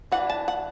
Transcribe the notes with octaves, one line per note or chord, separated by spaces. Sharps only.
E3 D4 F#5
A5
F#5